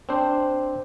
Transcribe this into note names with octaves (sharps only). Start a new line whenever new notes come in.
C4 D4 C5